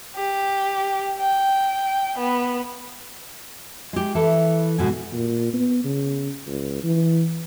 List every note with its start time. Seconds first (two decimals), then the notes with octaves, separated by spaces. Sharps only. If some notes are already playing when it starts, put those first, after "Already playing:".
0.16 G4
1.20 G5
2.18 B3
3.93 G#3 G4
4.15 E3 E4 A4
4.78 G#2 B2 G#5
5.13 A#2
5.54 B3
5.84 C#3
6.47 C#2
6.83 E3